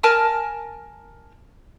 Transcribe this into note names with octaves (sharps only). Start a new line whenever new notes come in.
A#4 G#5 A5 F6